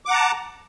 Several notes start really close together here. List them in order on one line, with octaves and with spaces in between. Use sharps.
D6 F#5 A#5 A5